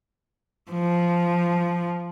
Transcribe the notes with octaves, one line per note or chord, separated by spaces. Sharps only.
F3